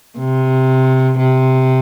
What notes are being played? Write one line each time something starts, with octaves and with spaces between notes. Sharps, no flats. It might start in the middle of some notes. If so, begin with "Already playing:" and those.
C3
C3